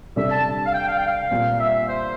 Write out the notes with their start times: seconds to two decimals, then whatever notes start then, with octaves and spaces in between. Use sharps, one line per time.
0.16 C3 G3 D4 A4 E5
0.31 A5
0.66 F5
0.74 G5
0.88 F5
0.97 G5
1.06 F5
1.31 A#2 G3 C4
1.60 E5
1.88 C5